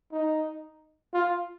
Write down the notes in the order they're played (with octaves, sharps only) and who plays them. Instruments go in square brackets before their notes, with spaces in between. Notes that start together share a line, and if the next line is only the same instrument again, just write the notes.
[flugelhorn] D#4
F4